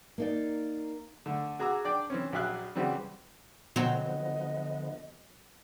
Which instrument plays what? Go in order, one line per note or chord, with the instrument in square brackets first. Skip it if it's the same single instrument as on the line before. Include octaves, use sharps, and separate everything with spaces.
[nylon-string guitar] A#3 D#4 D5
[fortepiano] D3 A3
F#4 G#4 A#5 D6 E6
D4 D5 G5
E3 C4 C#4
A#1 F#3 G4 E5 F5 F#6
C#3 E3 G3 C4 F#4
[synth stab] B2 [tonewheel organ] D3 F3 B3 [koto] F#3 C4 C5 [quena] D#5